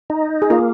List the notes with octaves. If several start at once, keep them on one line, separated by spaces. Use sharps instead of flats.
D#4
G#4
A#3 F4 A#4